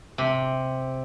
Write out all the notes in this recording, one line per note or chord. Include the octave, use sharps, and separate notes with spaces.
C3